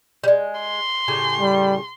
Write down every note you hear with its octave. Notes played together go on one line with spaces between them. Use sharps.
G3 G#3
C6
A2 C#3 G4
G3